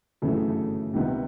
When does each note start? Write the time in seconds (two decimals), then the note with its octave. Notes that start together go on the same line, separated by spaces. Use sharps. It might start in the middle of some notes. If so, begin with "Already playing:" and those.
0.22 G1 F#2 C#3 E3 A3 A4
0.35 G#4
0.50 A4
0.94 C#2 C3 D#3 G3 B3